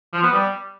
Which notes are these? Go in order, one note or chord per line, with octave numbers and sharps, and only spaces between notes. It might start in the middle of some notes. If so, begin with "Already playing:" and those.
F3
B3
G3